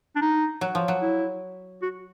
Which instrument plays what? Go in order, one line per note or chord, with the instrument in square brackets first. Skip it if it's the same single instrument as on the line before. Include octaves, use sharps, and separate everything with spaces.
[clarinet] D4
D#4
[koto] F#3
F3
F#3
[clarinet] E4
F#4